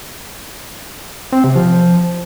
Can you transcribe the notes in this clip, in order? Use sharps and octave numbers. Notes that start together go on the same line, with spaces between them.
C4
C3
F3